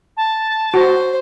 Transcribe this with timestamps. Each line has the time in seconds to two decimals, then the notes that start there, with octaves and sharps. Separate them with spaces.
0.17 A5
0.74 F#4 C5